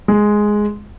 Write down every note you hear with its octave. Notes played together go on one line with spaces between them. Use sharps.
G#3